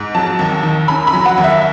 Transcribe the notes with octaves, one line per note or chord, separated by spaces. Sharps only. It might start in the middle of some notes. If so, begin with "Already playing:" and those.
Already playing: G#2
F#3 A5
D#2
D#3
C#4 B5
B5
F#3
F#5
D#2
E5